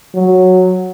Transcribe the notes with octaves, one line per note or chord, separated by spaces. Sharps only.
F#3